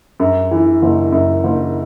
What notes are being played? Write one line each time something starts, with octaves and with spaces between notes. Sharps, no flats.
F#2
E3
F#1
F#2
F#1